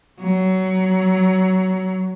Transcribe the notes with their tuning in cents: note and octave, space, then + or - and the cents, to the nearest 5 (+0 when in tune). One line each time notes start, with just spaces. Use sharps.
F#3 +20